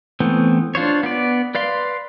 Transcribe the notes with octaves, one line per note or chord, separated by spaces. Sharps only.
E3 A3 B3 C4
D4 F4 C5 C#5
B3 D5
B4 D5 F5 C6